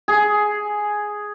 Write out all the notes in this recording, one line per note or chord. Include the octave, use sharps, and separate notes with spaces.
G#4